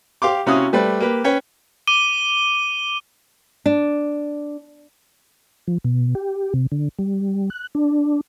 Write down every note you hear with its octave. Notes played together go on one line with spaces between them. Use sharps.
G4 F5 C6 D6
C3 C#4 E4 F#4 F5 D#6
G3 A3 B4 C5 D5
A#3 G4 B4
C#4 B4 C#5 G5
D6 D#7 G7
D4
F3
B2
G4
C3
D3
G3
F#6
D4